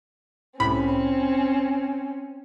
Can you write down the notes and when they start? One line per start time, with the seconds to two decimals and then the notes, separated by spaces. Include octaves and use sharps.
0.60 C2 A2 C4 C#4 B5